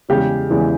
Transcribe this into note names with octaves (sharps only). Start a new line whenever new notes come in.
E2 C#3 E3 G#3 G4
E2 C#3 E3 G#3